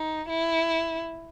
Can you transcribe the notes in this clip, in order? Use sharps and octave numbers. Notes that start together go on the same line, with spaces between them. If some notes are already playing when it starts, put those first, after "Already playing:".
Already playing: D#4
E4